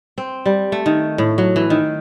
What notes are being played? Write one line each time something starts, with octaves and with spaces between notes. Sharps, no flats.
C4
G3
A3
D#3
A2
F#3
E3
D#3